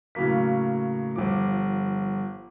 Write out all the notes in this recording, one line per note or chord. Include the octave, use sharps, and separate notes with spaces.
A2 C#3 F#3 A#3 B6
G1 F3 D6